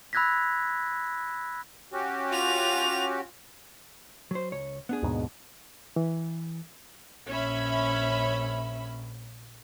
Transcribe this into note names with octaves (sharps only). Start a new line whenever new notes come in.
B5 E6 F#6 G#6 A#6 B6
C#4 F#4 G4
F4 F7
F#3 C5
C#2 C#5
B3 D4 G#4
D#2 G#2 B2
E3
A#1 C#4 E5 B5